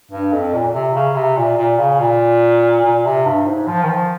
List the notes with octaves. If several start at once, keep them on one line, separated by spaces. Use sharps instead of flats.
G2
F2
A#2
C3
C#3
C3
A#2
A#2
C#3
A#2
A#2
C3
G2
G#2
F3
D#3
F3